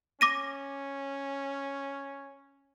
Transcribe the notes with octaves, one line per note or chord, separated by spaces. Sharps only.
C#4 D6 A#6 D#7